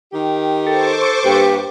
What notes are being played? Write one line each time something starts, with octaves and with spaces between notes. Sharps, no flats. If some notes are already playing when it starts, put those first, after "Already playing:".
D#3 G4
A4 C5 C#6 D6
G2 A#3 G4 B4